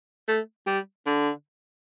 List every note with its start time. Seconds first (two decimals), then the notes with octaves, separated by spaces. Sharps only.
0.28 A3
0.67 G3
1.06 D3